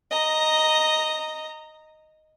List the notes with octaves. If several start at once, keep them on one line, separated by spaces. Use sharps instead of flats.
D#5 A#5